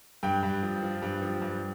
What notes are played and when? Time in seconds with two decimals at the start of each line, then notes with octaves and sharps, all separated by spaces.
0.23 G2 G5
0.43 G2
0.63 F3
0.83 F3
1.02 G2
1.22 F3
1.42 G2